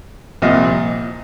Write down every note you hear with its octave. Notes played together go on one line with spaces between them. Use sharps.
C2 A#2 F3 C4 D#5